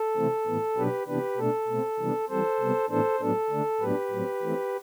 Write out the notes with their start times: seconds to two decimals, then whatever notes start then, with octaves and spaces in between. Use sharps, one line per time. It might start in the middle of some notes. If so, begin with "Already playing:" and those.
Already playing: A4
0.16 C3 E3 A3 C4
0.47 A2 E3 B3
0.76 B2 F#3 B3 D4 G4 B4
1.07 C3 E3 B3 D4 G4 B4
1.37 B2 A3 D4 A4
1.68 B2 A3 C4
1.99 C3 E3 G3 B3 D4
2.29 E3 G3 C4 A4 C5
2.60 C3 G3 B3
2.89 A2 E3 B3 D4 A4 C5
3.20 A2 F#3 B3 D4 A4
3.50 D3 A3 D4
3.81 A2 F#3 B3 D4 G4 B4
4.11 A2 F#3 C4
4.42 E3 A3 C4